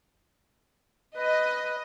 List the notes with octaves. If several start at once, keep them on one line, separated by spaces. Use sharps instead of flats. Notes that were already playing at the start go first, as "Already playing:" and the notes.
B4 D#5